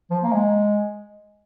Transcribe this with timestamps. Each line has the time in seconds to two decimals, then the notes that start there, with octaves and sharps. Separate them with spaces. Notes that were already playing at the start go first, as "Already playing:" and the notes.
0.11 F3
0.23 A#3
0.33 G#3